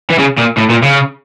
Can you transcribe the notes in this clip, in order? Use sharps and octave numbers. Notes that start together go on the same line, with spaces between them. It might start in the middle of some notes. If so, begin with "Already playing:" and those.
E3
C#3
A#2
A2
A#2
C#3